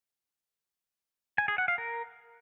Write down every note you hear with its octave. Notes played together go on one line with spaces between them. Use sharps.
G#5
G#4
F#5
F5
A#4